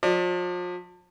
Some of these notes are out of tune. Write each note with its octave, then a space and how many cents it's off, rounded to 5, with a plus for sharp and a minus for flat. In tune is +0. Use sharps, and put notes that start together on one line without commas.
F3 +40 D5 +35